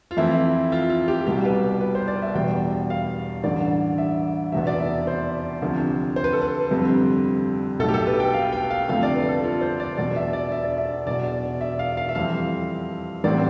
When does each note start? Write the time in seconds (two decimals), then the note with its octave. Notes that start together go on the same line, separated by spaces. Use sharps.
0.11 F4
0.17 F2 E3 A3 C4 E4
0.72 F4
0.90 F4
1.08 G4
1.27 C2 B2 G3 G4
1.45 B4
1.81 B4
1.95 C5
2.08 D5
2.22 E5
2.35 E1 E2 B2 G3 B3 G5
2.90 F5
3.43 A1 G2 D3 D5
3.98 E5
4.52 F1 E2 B2 B3 E5
4.67 D5
4.80 E5
5.07 C5
5.62 D2 C3 F3
6.16 C5
6.24 B4
6.33 A4
6.42 B4
6.71 G1 F2 C3 G3 C4
7.79 B1 B2 A3 A4
7.88 G4
7.94 A4
8.07 B4
8.20 G5
8.34 F5
8.53 G5
8.70 F5
8.89 G1 F2 C3 F3 A3 F5
9.03 D5
9.15 B4
9.29 A4
9.44 F4
9.61 C5
9.80 D5
9.97 E1 E2 B2 B3 D5
10.16 E5
10.33 D5
10.52 E5
10.65 D5
10.78 E5
11.06 E1 E2 B2 D5
11.61 E5
11.79 F5
11.97 F5
12.09 E5
12.15 F2 E3 G3 C4 F5
13.24 A1 A2 G3 C4 D5